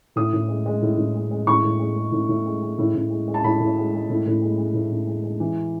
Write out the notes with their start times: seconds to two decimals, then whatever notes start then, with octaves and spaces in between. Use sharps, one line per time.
0.16 A2 D#6
0.33 A2
0.48 G#3
0.66 G#3
0.82 A2
0.98 A2
1.15 G#3
1.31 G#3
1.47 A2 C#6
1.63 A2
1.79 G#3
1.96 G#3
2.12 A2
2.29 A2
2.46 G#3
2.61 G#3
2.78 A2
2.95 A2
3.10 G#3
3.28 G#3
3.34 A5
3.44 A2 B5
3.60 A2
3.77 G#3
3.93 G#3
4.10 A2
4.26 A2
4.42 G#3
4.58 G#3
4.74 A2
4.90 A2
5.07 G#3
5.24 G#3
5.40 E3